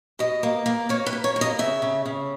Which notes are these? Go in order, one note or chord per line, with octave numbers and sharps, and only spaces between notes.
B2 D#5
A#3
A#3
A#3 C#5
B4
A#3
C#5
A#3
D#5
C#3 E5
C#3
C#3